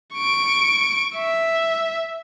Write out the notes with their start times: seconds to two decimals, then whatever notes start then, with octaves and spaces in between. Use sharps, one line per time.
0.15 C#6 D7
1.16 E5